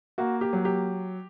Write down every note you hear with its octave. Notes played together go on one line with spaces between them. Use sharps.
A#3 F#4
G4
F#3
G4